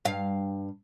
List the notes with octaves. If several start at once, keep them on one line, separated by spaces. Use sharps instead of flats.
G2 F5